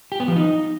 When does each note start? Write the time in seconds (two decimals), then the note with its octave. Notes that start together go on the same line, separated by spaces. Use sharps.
0.12 G4
0.20 B3
0.28 F3
0.36 D#4